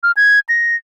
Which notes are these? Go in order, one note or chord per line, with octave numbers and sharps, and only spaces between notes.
F6
G#6
A#6